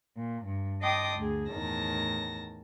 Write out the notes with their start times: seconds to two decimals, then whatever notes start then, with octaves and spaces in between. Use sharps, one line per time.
0.16 A#2
0.44 G2
0.81 D#5 G5 A5 C6 D6 D#6
1.16 D2 G#4
1.50 E2 A2 D#3 A5 A#6